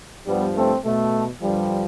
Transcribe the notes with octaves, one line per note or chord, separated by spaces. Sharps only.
G2 F3 G3 B3
A3 C4
B2 A3
G2 D3 F3 G3